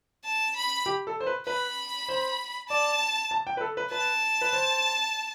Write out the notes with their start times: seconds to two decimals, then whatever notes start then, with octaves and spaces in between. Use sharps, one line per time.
0.25 A5
0.56 B5
0.86 G4
1.07 A4
1.20 C5
1.26 B4
1.47 B4 B5
2.09 C5
2.69 D5 A5
3.31 A5
3.47 G5
3.57 B4
3.61 A4
3.77 B4
3.91 B4 A5
4.41 B4
4.53 C5